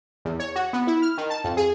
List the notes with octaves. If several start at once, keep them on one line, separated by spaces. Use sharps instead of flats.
E2
C#5
F#4
B3
E4
F6
D#3
A5
F2
G#4